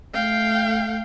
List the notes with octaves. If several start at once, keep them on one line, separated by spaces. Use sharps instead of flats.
A3 F5 G5